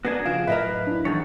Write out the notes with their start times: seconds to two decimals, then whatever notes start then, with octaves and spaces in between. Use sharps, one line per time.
0.05 B3 D4 F#4 G#4 A#4 G#5
0.25 F2 C#3 F4 F5 D7 E7
0.47 A2 A#4 B4 D#5 E5
0.62 F#2
0.87 D4 E4
1.05 E2 D#3 G#4 A4 C#5